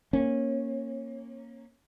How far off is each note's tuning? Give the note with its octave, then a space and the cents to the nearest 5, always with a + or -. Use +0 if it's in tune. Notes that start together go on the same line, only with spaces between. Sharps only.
A#3 +0 C#4 -20